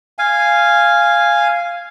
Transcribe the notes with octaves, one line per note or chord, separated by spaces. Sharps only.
F5 G#5